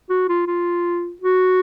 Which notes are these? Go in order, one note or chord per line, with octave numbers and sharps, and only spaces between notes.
F#4
F4
F4
F#4